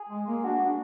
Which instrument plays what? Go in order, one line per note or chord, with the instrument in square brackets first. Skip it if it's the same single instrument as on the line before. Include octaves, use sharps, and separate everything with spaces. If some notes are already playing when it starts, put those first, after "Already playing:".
Already playing: [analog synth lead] G#4
[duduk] G#3
A#3
[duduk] D4 [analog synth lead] F#4
[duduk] D4